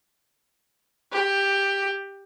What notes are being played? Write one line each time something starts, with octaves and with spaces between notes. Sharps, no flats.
G4